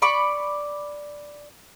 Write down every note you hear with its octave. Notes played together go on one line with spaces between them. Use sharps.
D5 B5 C#6 D6